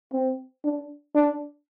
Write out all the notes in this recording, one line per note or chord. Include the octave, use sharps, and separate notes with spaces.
C4
D4
D4